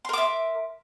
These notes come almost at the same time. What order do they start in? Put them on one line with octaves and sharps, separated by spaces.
C6 A#4 D6 E5